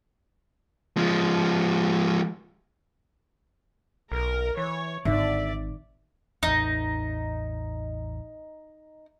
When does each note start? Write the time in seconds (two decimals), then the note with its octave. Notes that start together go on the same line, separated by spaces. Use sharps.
0.97 F3 G#3
4.12 B1 A#4
4.57 E3 C#5
5.05 G#1 D3 D5 E5
6.43 A1 E2 D#4